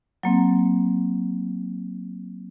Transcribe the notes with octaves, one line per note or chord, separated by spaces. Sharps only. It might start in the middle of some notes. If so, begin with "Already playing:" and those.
F#3 A#3 C4